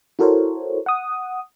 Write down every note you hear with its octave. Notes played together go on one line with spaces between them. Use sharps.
E4 F#4 A4 A#4 C5 C#5
F#5 D#6